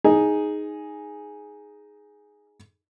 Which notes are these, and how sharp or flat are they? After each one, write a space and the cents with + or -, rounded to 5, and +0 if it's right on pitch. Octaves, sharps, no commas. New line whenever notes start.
D#4 +0 G#4 +0